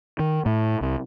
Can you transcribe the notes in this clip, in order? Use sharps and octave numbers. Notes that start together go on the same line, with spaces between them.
D#3
A2
C2